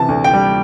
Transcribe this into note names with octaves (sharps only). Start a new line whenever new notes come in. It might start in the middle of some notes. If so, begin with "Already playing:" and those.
Already playing: C3 E3 A5
D2
G5
G3